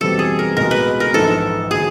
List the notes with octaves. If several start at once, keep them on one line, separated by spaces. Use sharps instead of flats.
F#1 E2 B2 G3 C4 A4
G#4
A#4
C#2 B2 G#3 A#4
B4
A#4
A#1 G#2 E3 A4
D3 F#3 G#4